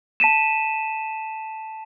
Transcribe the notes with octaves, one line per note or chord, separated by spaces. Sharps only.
A5 B6 D#7 E7